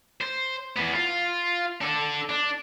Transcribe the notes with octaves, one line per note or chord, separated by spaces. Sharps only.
C5
E2 B3
F4
D4 A4
D4